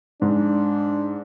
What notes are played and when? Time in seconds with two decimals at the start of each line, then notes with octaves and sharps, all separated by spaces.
0.22 G#2 D4